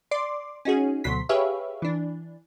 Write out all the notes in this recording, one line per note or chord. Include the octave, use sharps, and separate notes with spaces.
D5 C6 D6
C#4 D#4 F#4 G#4
D2 B2 F#3 C6 B6
G4 G#4 B4 C#5 E5 F5
E3 D4